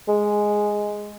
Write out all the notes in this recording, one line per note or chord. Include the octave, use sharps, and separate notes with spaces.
G#3